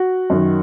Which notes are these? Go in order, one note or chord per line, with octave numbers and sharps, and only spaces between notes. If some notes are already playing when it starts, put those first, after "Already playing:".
Already playing: F#4
F#2 D#3